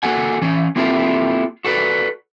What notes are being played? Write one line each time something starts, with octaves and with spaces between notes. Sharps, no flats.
A#3 F#4 A4 F#5 G#5
E3 C#4
A#3 C4 E4 F4 G4 A4
F#4 A4 B4 D5